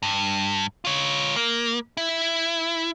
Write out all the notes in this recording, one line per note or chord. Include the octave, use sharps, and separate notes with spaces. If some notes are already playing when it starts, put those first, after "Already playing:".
G2
F4 C#5
A#3
E4